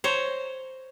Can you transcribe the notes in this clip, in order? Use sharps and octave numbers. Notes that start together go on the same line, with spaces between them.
C5 C#5 A#5